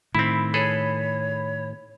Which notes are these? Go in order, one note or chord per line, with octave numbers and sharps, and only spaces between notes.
A2 D#3 C4 E4 B5
G#4 A4 B4 C#5